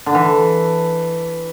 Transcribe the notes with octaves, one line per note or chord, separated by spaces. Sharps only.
D3
E3